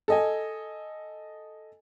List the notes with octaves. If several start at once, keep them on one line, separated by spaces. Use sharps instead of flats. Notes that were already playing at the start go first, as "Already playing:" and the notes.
A4 D#5 G#5